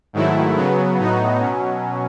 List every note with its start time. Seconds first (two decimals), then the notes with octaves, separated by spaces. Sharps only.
0.13 G#2 D#3 F#3 A3 E4
0.56 C#3 F#3 B3
0.99 A2 F#3 B3 D#4 F#4
1.40 B2 F#3 C#4